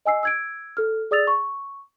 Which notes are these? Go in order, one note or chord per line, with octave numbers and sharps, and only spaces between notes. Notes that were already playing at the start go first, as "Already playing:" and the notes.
D#5 G#5 E6 C7
E6 G#6 D7
A4 F6
G#4 D5 D#6 E6 A6 F7
C#6